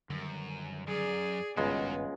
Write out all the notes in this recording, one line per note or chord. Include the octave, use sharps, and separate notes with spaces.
F#2 D3 D#3 G3
F#2 G#4 D5
G#1 C#2 G2 D#3 G#3 B3 F#4 A#4